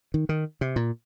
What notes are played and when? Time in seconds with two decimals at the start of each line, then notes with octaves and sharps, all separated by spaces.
0.14 D#3
0.29 D#3
0.61 C3
0.76 A#2